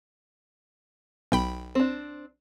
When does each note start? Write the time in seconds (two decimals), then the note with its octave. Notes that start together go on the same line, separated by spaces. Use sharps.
1.32 B1 G5 B5
1.75 C4 D4